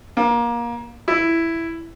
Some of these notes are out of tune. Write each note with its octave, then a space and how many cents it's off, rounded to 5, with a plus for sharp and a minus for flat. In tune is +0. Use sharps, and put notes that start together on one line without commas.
A#3 +25
E4 +5